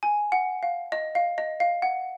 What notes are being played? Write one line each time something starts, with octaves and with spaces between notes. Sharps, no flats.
G#5
F#5
F5
D#5
F5
D#5
F5
F#5